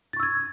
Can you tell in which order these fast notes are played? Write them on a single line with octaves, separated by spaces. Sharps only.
A6 C#6 E6 G#6